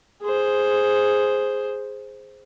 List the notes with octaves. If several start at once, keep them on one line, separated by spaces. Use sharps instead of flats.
G#4 C5